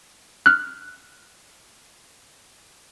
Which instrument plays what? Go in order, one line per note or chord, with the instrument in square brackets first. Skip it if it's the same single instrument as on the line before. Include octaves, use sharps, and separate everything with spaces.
[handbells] F6 F#6